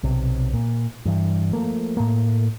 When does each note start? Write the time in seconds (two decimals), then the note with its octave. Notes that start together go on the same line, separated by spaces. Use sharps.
0.03 B1 C3
0.54 A#2
1.05 G2 E3
1.53 F3 A3 A#3
1.97 A2 A3 A#3